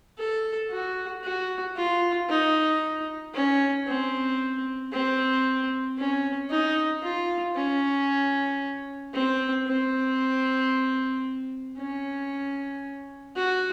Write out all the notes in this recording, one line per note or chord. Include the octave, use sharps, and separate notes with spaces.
A4
F#4
F#4
F4
D#4
C#4
C4
C4
C#4
D#4
F4
C#4
C4
C4
C#4
F#4